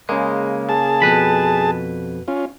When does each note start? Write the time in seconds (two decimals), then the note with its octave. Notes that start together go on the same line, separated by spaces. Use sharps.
0.09 C#3 G#3 A#3
0.69 G#4 A5
1.02 F2 B2 B4 B5
2.28 C#4 F4